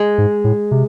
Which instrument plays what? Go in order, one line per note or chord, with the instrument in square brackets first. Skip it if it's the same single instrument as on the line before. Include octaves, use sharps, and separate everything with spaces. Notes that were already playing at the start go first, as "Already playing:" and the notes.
Already playing: [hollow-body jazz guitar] G#3
[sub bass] G#2
A2
C3